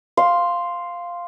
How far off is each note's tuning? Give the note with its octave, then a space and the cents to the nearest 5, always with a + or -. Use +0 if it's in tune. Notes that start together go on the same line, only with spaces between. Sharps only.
F5 +0 C6 +0